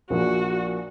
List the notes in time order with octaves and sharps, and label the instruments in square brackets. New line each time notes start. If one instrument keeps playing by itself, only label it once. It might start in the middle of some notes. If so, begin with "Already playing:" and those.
[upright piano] A#1 A#2 F3 A#3 [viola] F#4